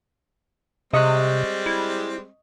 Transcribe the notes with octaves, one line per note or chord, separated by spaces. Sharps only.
C3 G3 G#3 C4 D#5 C#6 F#6
E4